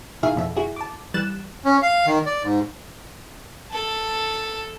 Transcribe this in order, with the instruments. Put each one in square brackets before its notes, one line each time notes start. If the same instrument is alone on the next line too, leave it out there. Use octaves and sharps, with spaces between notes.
[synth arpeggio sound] B2 D#3 E4 G#4 E5 F5
F2 B2 E5
E4 F#4 G#4
A5 D6
E3 G3 F#6 A6 E7
[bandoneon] C#4
F5
D#3
D5
G#2
[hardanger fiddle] A4 A5